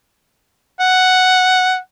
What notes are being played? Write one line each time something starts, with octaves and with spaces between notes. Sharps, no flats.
F#5